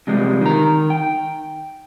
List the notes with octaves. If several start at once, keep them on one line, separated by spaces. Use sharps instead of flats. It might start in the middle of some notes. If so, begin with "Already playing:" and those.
C3 F3 G3 G#3
D#3 A#5
G5